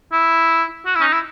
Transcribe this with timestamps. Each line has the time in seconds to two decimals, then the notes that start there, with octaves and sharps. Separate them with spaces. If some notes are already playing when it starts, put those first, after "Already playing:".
0.12 E4
0.86 F#4
0.95 E4
1.00 C#4
1.04 D#4
1.13 E4